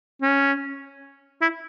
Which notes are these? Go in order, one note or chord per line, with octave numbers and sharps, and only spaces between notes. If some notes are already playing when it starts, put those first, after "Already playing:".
C#4
E4